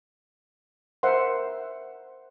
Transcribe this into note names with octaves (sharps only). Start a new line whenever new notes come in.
A#4 C5 E5 F#5 C6